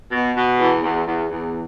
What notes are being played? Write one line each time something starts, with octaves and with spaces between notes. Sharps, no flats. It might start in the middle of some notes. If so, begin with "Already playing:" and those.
B2
B2
E2
E2
E2
E2